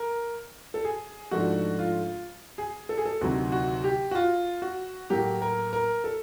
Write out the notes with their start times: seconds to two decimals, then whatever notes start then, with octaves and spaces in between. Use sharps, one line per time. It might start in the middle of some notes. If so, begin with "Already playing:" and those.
Already playing: A#4
0.74 A4
0.84 G#4
1.31 G#2 F3 A3 D4 F#4
1.79 F4
2.58 G#4
2.89 A4
2.98 G#4
3.05 A4
3.21 D2 C3 D#3 F#3 F#4
3.52 F#4
3.84 G4
4.11 F#4
4.15 F4
4.62 F#4
5.10 A2 F#3 A#3 G4
5.42 A#4
5.73 A#4
6.04 A4